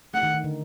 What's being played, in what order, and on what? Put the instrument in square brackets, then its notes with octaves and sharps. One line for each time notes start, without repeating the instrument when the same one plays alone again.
[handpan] A3 [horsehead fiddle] F#5
[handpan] D#3
D#3
D3